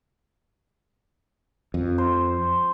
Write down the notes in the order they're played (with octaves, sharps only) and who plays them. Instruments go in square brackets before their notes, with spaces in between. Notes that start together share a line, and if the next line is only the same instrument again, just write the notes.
[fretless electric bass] F2
[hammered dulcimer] C5